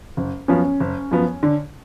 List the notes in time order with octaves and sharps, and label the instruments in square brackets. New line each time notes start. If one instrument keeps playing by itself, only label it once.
[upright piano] F#1
[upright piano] F#2 F3 B3 [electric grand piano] C#4
[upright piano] F#1
F#2 F3 B3
D3